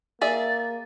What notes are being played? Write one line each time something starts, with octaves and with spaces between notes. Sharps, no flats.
A#3 G#4 D5 E5 A6